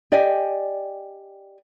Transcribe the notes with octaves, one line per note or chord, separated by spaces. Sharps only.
G4 D5 D#5 G5 G#5